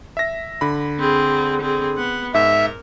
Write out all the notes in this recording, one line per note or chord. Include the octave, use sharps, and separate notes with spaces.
E5 A#6
D3 B5
C4 G#4
C4 G#4
B3 F#5
G#2 A#4 E5